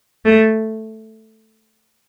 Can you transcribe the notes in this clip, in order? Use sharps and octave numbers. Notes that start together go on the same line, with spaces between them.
A3